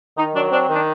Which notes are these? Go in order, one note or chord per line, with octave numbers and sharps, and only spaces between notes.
D#3 D#4
F#3 D4
C4 D4
D#3
D4